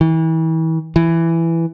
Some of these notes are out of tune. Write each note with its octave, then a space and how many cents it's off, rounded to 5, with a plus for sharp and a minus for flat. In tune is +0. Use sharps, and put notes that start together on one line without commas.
E3 -35
E3 +10